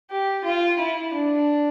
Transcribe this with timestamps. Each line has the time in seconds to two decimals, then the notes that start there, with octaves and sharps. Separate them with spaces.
0.10 G4
0.45 F4
0.79 E4
1.14 D4